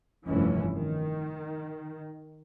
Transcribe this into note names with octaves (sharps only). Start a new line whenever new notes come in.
F1 G2 E3 C#4
D#3